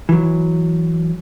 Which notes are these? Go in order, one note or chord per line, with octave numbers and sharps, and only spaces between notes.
E3 F#3